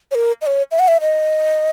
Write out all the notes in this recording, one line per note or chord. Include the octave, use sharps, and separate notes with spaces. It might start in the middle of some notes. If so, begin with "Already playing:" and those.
C#5
A#4
D#5
C#5
E5
F#5
E5
D#5